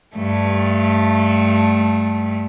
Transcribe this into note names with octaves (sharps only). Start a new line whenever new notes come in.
G2 A3